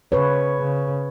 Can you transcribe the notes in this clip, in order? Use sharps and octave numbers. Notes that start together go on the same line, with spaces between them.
C#3 B4 C#5
C#3